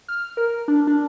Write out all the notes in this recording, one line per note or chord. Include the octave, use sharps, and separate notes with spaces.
F6
A#4
D4
D4